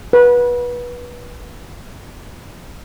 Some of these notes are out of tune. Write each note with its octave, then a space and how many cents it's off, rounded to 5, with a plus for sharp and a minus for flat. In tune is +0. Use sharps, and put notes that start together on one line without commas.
B4 -20